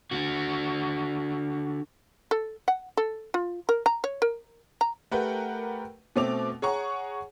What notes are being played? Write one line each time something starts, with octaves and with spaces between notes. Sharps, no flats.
D3 F#4
A4
F#5
A4
F4
A#4
A#5
C#5
A#4
A#5
A3 G4 A#4 B4 F#5 G5
B2 A3 C4 D6 F7
G#4 C#5 F#5 A#5 C#6